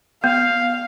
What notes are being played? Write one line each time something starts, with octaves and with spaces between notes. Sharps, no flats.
B3 F5